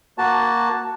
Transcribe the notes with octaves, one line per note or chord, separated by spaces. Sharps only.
A#3 F#4 A5